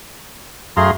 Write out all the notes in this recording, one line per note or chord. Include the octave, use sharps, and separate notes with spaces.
F#2 A3 G#4 F5 A#5 C6